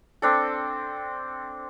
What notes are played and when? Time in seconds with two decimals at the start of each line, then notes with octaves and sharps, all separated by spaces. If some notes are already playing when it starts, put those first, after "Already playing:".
0.22 C4 D4 A4